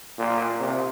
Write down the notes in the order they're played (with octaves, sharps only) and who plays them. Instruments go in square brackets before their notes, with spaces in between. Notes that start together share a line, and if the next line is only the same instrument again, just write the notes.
[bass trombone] A#2
C3